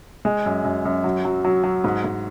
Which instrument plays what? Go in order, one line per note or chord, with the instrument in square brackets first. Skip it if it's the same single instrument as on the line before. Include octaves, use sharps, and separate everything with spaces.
[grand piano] G#3
F#2
F#2
F#2
F#3
F#3
F#3
F#3
G#2
G#2